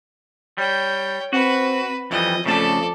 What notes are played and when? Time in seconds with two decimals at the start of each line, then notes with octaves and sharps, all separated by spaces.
0.58 G3 C#5 G5
1.33 C4 F#4 B4
2.11 F2 E3 F3 G3 D#5
2.46 F2 C#3 A3 A4 D5 A5